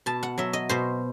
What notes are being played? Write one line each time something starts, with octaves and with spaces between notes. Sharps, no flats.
B2 A5
F#5
F#3 E5
D#5
B2 C5